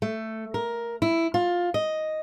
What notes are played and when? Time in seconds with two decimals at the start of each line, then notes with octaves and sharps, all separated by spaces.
0.02 A3
0.54 A#4
1.02 E4
1.34 F4
1.74 D#5